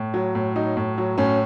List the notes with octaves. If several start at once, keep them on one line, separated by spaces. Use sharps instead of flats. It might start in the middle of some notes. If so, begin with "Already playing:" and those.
Already playing: A2
F#3
A2
F#3 D#4
A2
F#3
A2 C#4